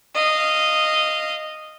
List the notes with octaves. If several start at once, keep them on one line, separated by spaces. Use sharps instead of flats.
D#5 F5